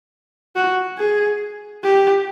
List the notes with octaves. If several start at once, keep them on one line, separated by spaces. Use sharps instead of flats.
F#4
G#4
G4